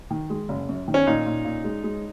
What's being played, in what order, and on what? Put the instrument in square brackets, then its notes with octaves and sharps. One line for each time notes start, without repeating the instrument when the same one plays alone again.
[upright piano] D#3
G#3
F#1
F#2
D#3
[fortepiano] C#4
[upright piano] A#2 [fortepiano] D#4
[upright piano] A#2
A#2
G#3
G#3